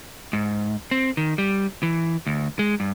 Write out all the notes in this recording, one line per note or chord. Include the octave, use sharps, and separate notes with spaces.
G#2
C4
D#3
G3
E3
D2
G#3
G2